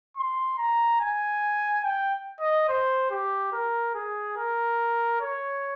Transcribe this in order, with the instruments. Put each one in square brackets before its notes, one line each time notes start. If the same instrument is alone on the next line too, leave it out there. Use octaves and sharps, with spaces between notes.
[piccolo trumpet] C6
A#5
G#5
G5
D#5
C5
G4
A#4
G#4
A#4
C#5